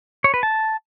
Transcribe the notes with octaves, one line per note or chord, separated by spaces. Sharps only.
C#5
B4
A5